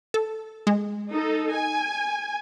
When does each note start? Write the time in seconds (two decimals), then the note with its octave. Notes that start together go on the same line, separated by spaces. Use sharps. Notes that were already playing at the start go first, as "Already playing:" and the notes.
0.14 A4
0.67 G#3
1.11 D#4 A4
1.54 G#5